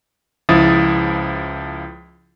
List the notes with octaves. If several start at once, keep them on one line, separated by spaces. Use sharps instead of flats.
C#2 F3 E4 D#6 A6